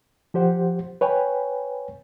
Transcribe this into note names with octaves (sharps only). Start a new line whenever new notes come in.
F3 G4 C5 F#5
B4 C#5 G5 G#5